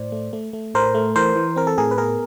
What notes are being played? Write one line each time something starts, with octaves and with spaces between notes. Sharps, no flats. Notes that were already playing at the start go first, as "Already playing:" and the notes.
Already playing: A2 C5 D5
A3
A3
A3
A2 A#4 C5
A3
E3 A#4 C5
E3
C4 A#4
A4
A2 G#4 A#4
B4
B3 G#4 A#4